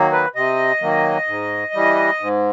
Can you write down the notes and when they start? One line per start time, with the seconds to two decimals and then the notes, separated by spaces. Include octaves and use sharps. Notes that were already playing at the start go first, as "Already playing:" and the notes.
Already playing: D#3 F#3 A#3
0.12 B4
0.35 C3 D#5
0.81 D#3 F#3 A#3
1.27 G#2
1.74 E3 G3
2.20 G#2